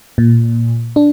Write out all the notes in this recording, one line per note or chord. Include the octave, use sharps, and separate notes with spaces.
A#2
D4